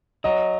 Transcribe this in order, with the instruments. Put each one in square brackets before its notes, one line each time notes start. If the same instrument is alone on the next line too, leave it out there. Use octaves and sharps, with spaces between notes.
[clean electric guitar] F#3 [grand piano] D#5